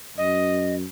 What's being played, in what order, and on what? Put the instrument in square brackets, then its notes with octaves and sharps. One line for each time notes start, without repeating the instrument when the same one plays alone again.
[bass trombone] F#2 [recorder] D#5